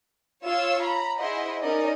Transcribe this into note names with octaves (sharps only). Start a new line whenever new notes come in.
F4 C#5 F5 E6
A#5 B5
E4 G#4 C5 D#5 F#5
C#4 D#4 A#4 D5 D#5